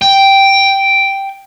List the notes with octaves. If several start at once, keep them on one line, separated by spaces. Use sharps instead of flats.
G5